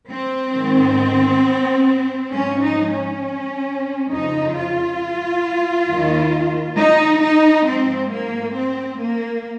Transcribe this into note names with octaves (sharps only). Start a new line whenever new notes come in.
C4
G#2 D#3
G#2 F3 C#4
D#4
C#4
F2 C#3 F3 D#4
F4
D#2 D#3
D#4
D#4
G#2 F3 C4
A#3
C4
A#3